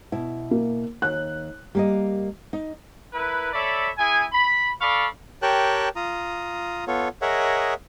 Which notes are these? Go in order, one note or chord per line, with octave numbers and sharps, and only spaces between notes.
B2 E4
A#3
D#2 F#6
G3 A#3 D#5
D#4
E4 A#4 B4
A4 C#5 D5 E5 B5
E4 G#4 G#5
B5
A4 D5 F5 B5 C#6
G4 A#4 C#5 G5 A5 F#6
F4 A#5 D#6
B3 F4 A4 C#5
G#4 A#4 C#5 D#5 E5 F#5